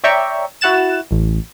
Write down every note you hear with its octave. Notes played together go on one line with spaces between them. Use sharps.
C#5 D5 E5 G5 A#5 C#6
E4 F#4 F#5 F#6 A6 E7
A1